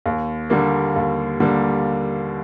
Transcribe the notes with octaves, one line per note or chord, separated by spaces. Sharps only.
D#2
D3 G3 A#3
D#2
D3 G3 A#3